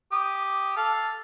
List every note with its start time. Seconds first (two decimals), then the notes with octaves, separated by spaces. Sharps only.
0.12 G4 D#6
0.77 A4 F5